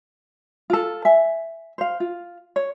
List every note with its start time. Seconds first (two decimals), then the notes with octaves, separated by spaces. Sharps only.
0.70 F4 A4
1.05 E5 G#5
1.78 C5 F5
2.00 F4
2.56 C#5